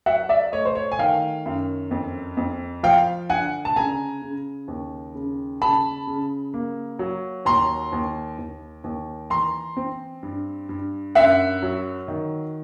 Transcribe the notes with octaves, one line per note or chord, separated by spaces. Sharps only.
F#3 E5 F#5
D5 E5
A3 C#5 D#5
C5
C#5
G#5
D#3 F5 G5
F#2
F2
F2
F3 F5 G5
D3 F#5 G#5
A5
C#3 G#5 A#5
C#3
D#2
C#3
C#3 A5 B5
C#3
A#3
F#3
D#2 A#5 C6
D#2
D#2
D#2
E3 A#5 C6
C4
G2
G2
F#2 E5 F#5
F#3
D#3